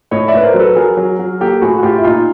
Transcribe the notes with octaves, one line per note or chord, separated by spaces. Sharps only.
A2 C#5 D#5
D5 E5
A2 B4
A#4 C5
F#3
A4 B4
F#3 G#4 A#4
F#3
F#3
A#3 G4 A4
A2 F#4 G#4
F#4
A2 F4 G4
E4
A#2 D#4 F4